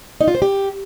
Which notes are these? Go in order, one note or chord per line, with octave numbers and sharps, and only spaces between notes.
D#4
F4
C5
G4